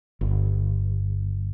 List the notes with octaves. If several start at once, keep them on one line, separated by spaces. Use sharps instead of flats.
G1